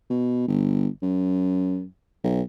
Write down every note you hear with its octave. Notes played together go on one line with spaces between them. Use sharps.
B2
G1
F#2
B1